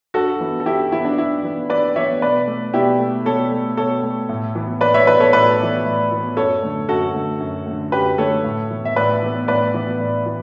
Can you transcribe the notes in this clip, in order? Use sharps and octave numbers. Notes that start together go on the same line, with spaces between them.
G2 F#4 A4
E3 B3
A4
G2 E4 G4
E3 B3 E4
D4
G2 E4
E3 B3
G2 B4 D5
E3 B3 C#5 E5
B2 B4 D5
A3
B2 E4 G4
A3
B2 A4 C#5
A3
B2 A4 C#5
A3
A2
E3 B3
A2 B4 D5
C#5 E5
E3 B3 B4 D5
A4 C#5
A2 B4 D5
E3 B3
A2
E3 B3
F#2 A4 C#5
D3 A3
F#2 F#4 A4
D3 A3
F#2
D3 A3
F#2 G4 B4
D3 A3 A4 C#5
A2
E3 B3
E5
A2 B4 D5
E3 B3
A2 B4 D5
E3 B3
A2
E3